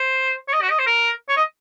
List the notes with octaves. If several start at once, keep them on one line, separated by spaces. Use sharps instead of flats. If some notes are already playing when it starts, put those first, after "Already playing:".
Already playing: C5
C#5
D#5
F#4
D#5
C5
A#4
C#5
D#5